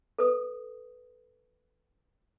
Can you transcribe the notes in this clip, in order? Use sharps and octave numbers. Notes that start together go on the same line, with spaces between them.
A4 B4 D#6